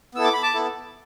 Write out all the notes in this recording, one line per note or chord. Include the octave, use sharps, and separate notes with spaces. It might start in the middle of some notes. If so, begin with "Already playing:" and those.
B3 E4 A4 E6
D6
B5
A5 D6
B3 E4 A4